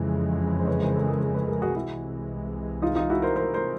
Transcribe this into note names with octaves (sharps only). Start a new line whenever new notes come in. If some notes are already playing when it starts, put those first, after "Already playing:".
Already playing: F2 C#3 E3 G#3
C5
B4 C#5
A#4 C5
A4 B4
G#4 A#4
G#4 A#4
A4 B4
G#4 A#4
F#4 G#4
C2 C3 E3 G#3 E4 F#4
D#4 F4
D#4 F4
E4 F#4
A#4 C5
A#4 C5
A#4 C5